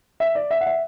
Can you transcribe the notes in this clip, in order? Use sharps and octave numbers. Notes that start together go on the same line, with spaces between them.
E5
D5
E5
F#5
E5